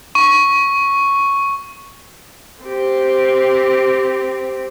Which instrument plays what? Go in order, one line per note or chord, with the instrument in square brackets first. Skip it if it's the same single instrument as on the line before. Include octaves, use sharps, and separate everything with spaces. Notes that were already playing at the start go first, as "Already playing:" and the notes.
[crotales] C#6
[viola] C4 G4